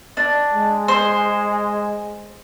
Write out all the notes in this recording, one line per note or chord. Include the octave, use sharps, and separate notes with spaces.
D4
G#3
C5